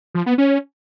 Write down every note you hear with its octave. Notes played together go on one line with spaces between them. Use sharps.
F3
B3
C#4